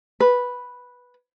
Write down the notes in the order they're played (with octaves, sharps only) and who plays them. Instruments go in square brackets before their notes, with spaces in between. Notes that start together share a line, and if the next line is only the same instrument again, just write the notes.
[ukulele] B4